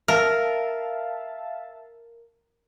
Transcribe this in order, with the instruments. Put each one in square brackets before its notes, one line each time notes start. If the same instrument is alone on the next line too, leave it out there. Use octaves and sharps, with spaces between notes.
[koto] A#4 [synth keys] E5 F5 A5